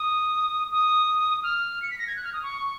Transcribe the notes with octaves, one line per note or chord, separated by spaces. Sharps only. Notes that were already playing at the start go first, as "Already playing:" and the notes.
Already playing: D#6
D#6
F6
C#7
B6
A#6
G#6
F#6
F6
D#6
C#6